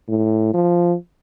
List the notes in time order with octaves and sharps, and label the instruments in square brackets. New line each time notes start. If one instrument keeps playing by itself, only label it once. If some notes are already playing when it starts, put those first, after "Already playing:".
[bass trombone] A2
F3